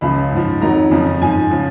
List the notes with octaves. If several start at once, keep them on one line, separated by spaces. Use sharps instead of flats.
C#2 C#3 F3 B5
G#2 F3
F2 D#3 F#3 A#5
F2 C#3 F3
G#2 F3 G#5
C#3 F3